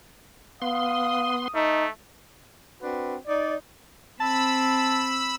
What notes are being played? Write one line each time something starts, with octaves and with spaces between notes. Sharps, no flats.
B3 F5 C6 D#6
A3 D#4
C4 D4 F#4 B4
D#4 D5
C4 A5 B5 E6